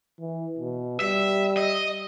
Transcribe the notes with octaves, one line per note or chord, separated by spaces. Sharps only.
E3
B2
G3 E5
D#5